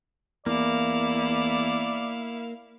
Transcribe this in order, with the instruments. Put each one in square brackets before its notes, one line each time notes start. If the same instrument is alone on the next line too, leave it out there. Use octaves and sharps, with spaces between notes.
[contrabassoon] E2 [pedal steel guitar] A#3 [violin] E4 F5 [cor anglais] D5